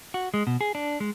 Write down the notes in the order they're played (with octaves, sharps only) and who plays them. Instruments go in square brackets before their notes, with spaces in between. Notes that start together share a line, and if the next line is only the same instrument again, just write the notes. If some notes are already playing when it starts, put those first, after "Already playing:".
[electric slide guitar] F#4
G#3
B2
G#4
D4
G#3